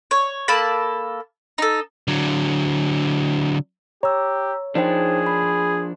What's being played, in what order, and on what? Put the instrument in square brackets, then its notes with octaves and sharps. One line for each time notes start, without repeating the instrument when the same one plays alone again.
[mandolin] C#5
A#3 A4 A5 B5
D#4 A4
[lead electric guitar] D3 F#3
[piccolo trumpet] G4 [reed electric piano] C#5 [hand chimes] A#5 E6
[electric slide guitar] F3 D4 [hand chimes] D#4 C5 G5 [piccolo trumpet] G#4
[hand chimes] B5